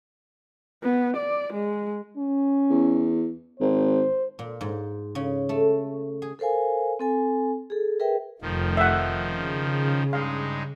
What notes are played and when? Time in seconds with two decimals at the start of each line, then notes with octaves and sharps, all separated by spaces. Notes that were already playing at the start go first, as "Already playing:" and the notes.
0.83 B3
1.17 D5
1.53 G#3
2.18 C#4
2.70 E2
3.60 G#1 C5
4.39 A#2
4.61 G#2
5.15 C#3
5.49 A3
6.22 G#4
6.39 A4 A#4 C5 F5 G#5
6.99 C4 A4 G#5
7.70 G#4 A4
7.99 G#4 A#4 B4 E5 G5
8.42 F1 F2 D#3 F3
8.77 E5 F#5
9.22 C#3
10.13 G2 G#3 D#4 F5